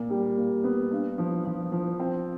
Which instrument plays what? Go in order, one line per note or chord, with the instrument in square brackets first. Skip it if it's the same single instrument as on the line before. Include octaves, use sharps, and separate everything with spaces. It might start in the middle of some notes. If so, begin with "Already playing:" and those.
Already playing: [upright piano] A#2
G3
A#2
B3
G2
F3
F3
F3
C4